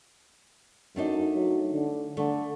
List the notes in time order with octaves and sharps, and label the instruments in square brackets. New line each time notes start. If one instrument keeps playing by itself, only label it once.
[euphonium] F#2 [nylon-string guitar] A3 D4 D#4
[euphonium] F#3
D3
[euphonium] D3 [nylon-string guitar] A3